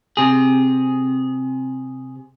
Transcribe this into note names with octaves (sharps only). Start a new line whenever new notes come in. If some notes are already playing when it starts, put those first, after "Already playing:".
C3 G#4